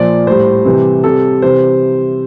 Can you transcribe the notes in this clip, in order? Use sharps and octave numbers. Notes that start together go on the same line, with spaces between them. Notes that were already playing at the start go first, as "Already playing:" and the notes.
Already playing: A#2 F3 D5
A2 G3 C5
C3 E3 G3
C3 G3 A4
C3 E3 G3 C5